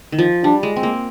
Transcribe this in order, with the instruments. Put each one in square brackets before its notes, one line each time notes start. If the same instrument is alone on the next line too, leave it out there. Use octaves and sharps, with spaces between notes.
[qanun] D#3
F3
[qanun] G3 [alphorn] D4
[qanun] G#3
C4
A#3